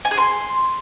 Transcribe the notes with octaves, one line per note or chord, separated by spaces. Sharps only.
G#5
G#4
C6